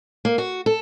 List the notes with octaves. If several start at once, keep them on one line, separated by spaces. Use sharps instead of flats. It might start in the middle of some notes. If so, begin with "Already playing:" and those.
A#3
F#4
A4